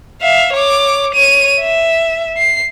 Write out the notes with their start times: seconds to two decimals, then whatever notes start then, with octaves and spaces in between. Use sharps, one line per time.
0.22 E5 F5
0.54 C#5 D6
1.15 C#5 D#7
1.60 E5
2.38 C7